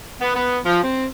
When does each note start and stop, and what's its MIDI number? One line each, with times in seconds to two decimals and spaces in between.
0.21 0.35 59
0.35 0.57 59
0.65 0.79 53
0.83 1.05 60